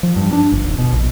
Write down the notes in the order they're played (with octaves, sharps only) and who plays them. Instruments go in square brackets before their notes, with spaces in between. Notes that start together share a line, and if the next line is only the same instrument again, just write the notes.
[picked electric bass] F3
G2
D4
G1
D#1
B2
A#1